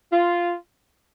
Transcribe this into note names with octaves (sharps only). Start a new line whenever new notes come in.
F4